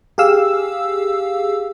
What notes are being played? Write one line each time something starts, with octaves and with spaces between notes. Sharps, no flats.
G4 G#4 F5 E6